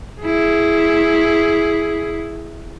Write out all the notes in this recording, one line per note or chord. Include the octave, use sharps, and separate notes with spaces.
E4 G#4